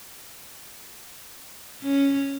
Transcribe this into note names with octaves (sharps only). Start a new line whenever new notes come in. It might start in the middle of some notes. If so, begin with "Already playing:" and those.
C#4